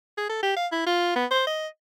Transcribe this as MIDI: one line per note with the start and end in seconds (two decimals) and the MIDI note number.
0.17 0.28 68
0.29 0.40 69
0.42 0.53 67
0.56 0.67 77
0.72 0.85 64
0.86 1.15 65
1.15 1.26 59
1.31 1.47 72
1.47 1.67 75